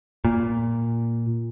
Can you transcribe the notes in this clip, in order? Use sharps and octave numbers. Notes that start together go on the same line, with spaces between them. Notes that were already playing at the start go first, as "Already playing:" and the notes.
A#2